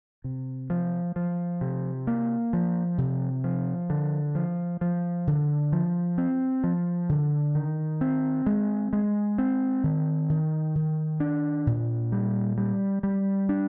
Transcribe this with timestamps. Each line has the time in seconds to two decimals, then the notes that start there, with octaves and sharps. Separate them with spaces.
0.24 C3
0.70 F3
1.16 F3
1.61 C3
2.07 A#3
2.53 F3
2.98 C3
3.44 F3
3.90 D3
4.35 F3
4.81 F3
5.27 D3
5.72 F3
6.18 C4
6.64 F3
7.09 D3
7.55 D#3
8.01 C4
8.46 G#3
8.93 G#3
9.38 C4
9.84 D#3
10.30 D#3
10.75 D#3
11.20 D4
11.67 A#2
12.12 G3
12.58 G3
13.03 G3
13.49 D4